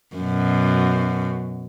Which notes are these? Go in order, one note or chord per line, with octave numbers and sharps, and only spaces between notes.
F#2 B2